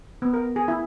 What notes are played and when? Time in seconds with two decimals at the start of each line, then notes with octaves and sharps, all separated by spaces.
0.22 B3
0.34 A#4
0.56 G#4
0.68 E4